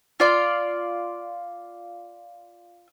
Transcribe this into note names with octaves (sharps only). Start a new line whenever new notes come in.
F4 D5 C6